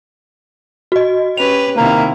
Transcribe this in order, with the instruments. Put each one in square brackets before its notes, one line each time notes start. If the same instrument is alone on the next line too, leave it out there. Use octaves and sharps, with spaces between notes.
[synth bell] F#4 D#5
[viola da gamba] C#4 G4 B4 [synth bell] F7
[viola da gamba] C3 D#3 E4 [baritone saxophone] A#3